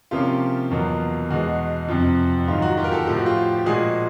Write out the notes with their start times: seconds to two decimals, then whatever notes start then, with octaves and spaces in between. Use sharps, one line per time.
0.11 C3 F3 A#3 C#4 F4 G4
0.71 E2 B2 F#3 A#3
1.30 E2 B2 G#3 F#4
1.88 F2 C3 F3
2.48 G#2 D#3 F#3 F4
2.62 F#4
2.77 F4 G4
2.84 A#4
2.92 G4 A4
3.07 A2 F3 A3 G4
3.16 F#4
3.26 F4 G4
3.59 G4
3.66 A#2 F3 G#3 F#4 G#4